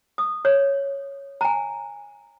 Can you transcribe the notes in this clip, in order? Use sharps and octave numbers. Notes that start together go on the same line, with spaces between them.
D#6
C#5
G#5 A#5